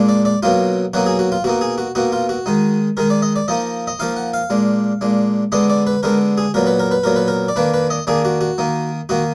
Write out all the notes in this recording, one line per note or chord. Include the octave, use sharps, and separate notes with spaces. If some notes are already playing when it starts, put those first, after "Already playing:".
Already playing: A#2 G#3 D4
D5
D5
B2 F#3 A#3 D#4 F4
B2 F#3 A#3 D#4 F#4
G#4
F#4
F4
B2 A#3 D#4 F#4
G#4
F#4
B2 A#3 D#4 F#4
F4
F#4
D#3 G#3 D#4
D#3 G#3 D#4 A#4
D5
D#5
D5
F3 A#3 D#4 D#5
D#5
F3 A#3 D#4 F5
F#5
F5
A#2 G#3 D4
A#2 G#3 D4
D3 G#3 B3 D4 D#5
D5
B4
D3 G#3 B3 D4 A#4
G#4
A#2 F#3 B3 A#4
B4
A#4
B4
A#2 F#3 B3 A#4
B4
A#4
D5
D#3 A#3 D4 B4
B4
D#5
D#3 A#3 D4 G#4
F#4
F#4
D#3 A#3 D#4
D#3 A#3 D#4 F#4